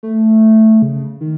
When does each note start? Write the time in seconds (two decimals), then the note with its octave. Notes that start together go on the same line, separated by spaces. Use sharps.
0.03 A3
0.82 C#3
1.21 D#3